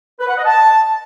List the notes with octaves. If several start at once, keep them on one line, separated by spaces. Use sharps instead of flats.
B4
F#5
D#5
A5